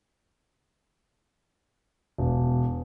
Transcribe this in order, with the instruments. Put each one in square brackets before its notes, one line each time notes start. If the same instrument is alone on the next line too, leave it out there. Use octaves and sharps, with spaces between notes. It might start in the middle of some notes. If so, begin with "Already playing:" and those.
[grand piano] E1